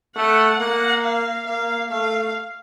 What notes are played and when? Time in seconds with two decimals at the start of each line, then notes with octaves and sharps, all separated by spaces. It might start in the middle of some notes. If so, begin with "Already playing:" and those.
0.16 A3 F#5
0.59 A#3 F#5
1.03 F5
1.47 A#3 F5
1.90 A3 F5